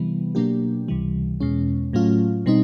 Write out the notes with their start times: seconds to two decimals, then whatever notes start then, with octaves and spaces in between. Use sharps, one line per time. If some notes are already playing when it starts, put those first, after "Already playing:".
Already playing: C3 E3 G3 B3
0.35 B2 F#3 A#3 D4 G4
0.88 C#2 C3 E3 G3
1.40 E2 B2 G#3 C#4
1.93 A2 F#3 A3 C#4 F4
2.46 B2 G3 C4 D#4